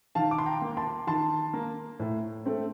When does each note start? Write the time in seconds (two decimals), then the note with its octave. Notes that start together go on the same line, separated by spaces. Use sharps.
0.15 D#3 F5 A5
0.31 D6
0.39 C6
0.46 G5 A#5
0.62 A#3
0.77 A5 C6
1.07 D#3 A5 C6
1.54 A#3
2.00 A2
2.46 A3 C4